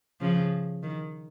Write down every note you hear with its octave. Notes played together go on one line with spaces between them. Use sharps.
C#3 F3
D#3